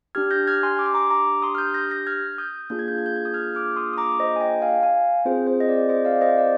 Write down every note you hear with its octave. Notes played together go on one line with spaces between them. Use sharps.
D4 G4 F6 G#6
G6 A#6
F6 G#6
G#5 C6
D6
C6
A#5 D6
A#5 D6
C6 D#6
F6
D#6 G6
G6 A#6
G6 A#6
F6 G#6
D#6 G6
A#3 D4 F4 G#4 G6
G#6
G6
G#6
G6
G#6
D#6 G6
F6 G#6
D6 F6
C6 D#6
D#6
A#5 D6
C5 D#5
G#5
D#5 G5
F5 G#5
F5 G#5
C4 F4 G#4 C5
C5
D#5
D5
C5 D#5
D5 F5
C5 D#5
D5